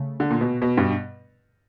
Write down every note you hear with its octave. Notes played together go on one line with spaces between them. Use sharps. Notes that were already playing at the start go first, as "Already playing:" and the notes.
Already playing: C#3 A3
D3
A#2
B2
B2
G2